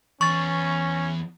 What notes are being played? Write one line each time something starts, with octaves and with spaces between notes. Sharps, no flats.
E2 C#4 C#6 A6